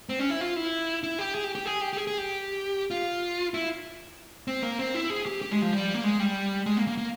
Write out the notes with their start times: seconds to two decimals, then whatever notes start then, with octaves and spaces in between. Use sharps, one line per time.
0.09 C4
0.19 C#4
0.30 E4
0.41 F4
0.56 E4
1.03 E4
1.19 G4
1.35 G#4
1.44 G4
1.55 G4
1.65 G#4
1.81 G4
1.93 G4
1.97 G#4
2.07 G#4
2.18 G4
2.91 F4
3.54 E4
4.48 C4
4.63 A#3
4.79 C4
4.94 E4
5.10 G#4
5.26 G4
5.42 G4
5.51 G#3
5.62 F3
5.73 G3
5.94 A#3
6.04 G#3
6.20 G3
6.66 G#3
6.77 A#3
6.87 A#3
6.98 A#3